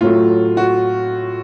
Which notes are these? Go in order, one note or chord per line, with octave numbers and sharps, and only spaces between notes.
A2 F#3 A3 F4
F#4